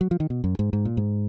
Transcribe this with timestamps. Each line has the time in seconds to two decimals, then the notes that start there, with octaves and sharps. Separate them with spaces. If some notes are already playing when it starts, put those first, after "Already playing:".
0.01 F#3
0.11 F3
0.20 D#3
0.30 B2
0.44 F#2
0.59 G#2
0.73 G#2
0.85 A#2
0.97 G#2